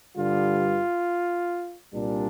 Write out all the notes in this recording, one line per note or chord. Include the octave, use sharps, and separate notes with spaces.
G2 D3 G3 F4
C2 A#2 G3 D4